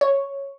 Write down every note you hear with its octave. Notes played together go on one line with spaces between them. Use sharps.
C#5